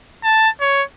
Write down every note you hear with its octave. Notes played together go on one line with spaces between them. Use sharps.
A5
C#5